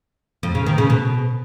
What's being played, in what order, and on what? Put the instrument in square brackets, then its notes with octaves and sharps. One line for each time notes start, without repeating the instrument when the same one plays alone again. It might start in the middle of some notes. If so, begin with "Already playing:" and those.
[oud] F2
C#3
D#3
C#3
B2